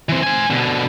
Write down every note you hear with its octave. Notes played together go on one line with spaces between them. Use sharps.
E3 C4
C5 G#5
B2 D3